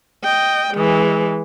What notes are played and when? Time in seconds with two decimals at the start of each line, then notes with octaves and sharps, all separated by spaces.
0.24 D#5 G5
0.74 E3 G#3